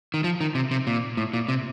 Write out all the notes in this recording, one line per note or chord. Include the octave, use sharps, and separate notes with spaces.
D#3
F3
D#3
C3
C3
A#2
A2
A#2
C3